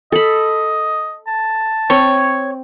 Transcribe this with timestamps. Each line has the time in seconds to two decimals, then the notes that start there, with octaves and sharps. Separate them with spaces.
0.12 A4 D#5 B5
1.27 A5
1.90 C4 C#5